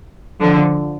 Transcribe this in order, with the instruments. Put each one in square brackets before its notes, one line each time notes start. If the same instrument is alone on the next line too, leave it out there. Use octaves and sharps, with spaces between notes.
[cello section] D3 F3